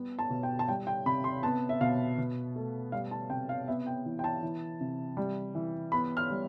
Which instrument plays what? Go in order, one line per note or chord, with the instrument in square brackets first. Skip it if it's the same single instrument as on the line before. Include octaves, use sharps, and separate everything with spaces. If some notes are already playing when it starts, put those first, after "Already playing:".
Already playing: [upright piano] G3 B3
A5
B2
G5
A5
G3 G5
G5
C3 B5
C6
B3 A5
E5
B2 F5
B2
A3
G3 F5
A5
C3 G5
F5
B3 E5
G5
E3
G5
A5
E3
C3
G3
E3
B3 B5
F6
G3